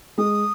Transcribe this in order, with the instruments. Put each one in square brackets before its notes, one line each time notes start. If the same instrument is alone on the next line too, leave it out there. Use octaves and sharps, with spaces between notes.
[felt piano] G#3 [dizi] D#6